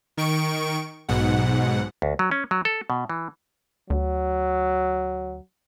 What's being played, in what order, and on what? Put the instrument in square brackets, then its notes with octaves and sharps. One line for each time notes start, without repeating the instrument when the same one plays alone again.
[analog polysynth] D#3 C#6 D7
B1 G#2 B2 F#5
[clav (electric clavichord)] D2
F#3
C#4
F#3
A4
B2
E3
[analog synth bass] D2 [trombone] F#3